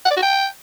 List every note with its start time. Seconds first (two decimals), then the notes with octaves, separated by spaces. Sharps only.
0.05 F#5
0.11 D5
0.17 F#4
0.22 G5